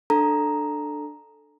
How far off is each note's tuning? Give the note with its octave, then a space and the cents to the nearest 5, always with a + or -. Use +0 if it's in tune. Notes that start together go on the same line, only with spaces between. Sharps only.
D4 +15 A4 +0 A#5 +0